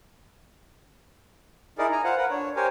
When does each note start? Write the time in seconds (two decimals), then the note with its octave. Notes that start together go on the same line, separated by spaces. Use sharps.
1.79 D#4 E4 G#4 A#4 D5
1.92 G#5 A#5
2.04 F4 C5 F5 F#5
2.17 A#4 B4 F#5
2.31 D4 C#5
2.56 G4 A#4 C5 C#5 G#5